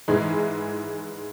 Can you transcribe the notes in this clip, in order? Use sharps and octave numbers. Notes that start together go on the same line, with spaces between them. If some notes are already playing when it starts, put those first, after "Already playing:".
G#2 E3 G#3